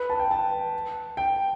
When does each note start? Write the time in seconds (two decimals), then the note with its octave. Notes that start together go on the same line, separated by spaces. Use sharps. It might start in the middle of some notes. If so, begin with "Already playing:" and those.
Already playing: B4
0.10 A5
0.19 G5
0.31 A5
1.17 G5